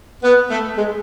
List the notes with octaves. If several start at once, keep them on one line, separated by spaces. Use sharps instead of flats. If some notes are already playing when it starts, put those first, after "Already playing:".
B3
A3
G#3